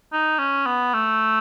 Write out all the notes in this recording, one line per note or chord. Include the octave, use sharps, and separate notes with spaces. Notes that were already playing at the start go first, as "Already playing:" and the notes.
D#4
C#4
B3
A3